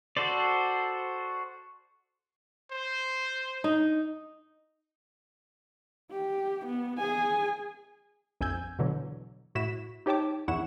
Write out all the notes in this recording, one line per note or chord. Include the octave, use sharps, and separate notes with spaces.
F#4 A4 C5 D5
C5
D#4
G4
B3
G#4 G#5
A#1 F2 G#5 E6 G6 G#6
B2 D3 E3 F#3
A2 E4 F#4 B6 E7
D#4 G4 C#5 G5 A5 D6
A#1 E2 E4 F#5 C#6 E7